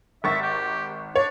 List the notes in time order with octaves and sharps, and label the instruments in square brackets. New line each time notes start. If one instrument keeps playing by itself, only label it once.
[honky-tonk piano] G#1 C#6 A6 [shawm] E5
[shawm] G4
[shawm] D4 [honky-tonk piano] C#5